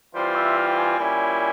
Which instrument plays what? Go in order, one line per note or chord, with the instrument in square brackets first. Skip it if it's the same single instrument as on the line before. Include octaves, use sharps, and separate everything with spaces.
[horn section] E3 G3 C4 F4 [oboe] C5
[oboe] E5
F5
G5
G#5
[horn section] A#2 G3 C#4 E4